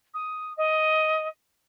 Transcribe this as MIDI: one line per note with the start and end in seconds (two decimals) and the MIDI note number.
0.14 0.53 87
0.57 1.27 75